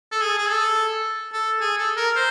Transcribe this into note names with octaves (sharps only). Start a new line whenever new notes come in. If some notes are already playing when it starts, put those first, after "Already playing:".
A4
G#4
G#4
A4
A4
G#4
A4
A#4
C5